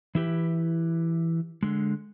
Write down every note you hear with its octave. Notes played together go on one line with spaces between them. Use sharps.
E3 E4 G4 B4
D3 G#3